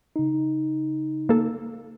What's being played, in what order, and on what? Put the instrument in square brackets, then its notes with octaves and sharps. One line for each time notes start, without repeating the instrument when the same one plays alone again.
[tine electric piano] C#3 D#4
[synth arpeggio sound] A#3 A4